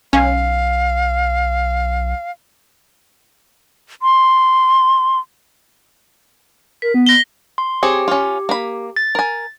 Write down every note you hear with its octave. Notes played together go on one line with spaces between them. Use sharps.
B1 C#4 F5
C6
A#4 B6
B3
A#6 G7
C6
C4 G4 G#4 C#5
C#4 F4
A#3 B5
A6
A#4 G#5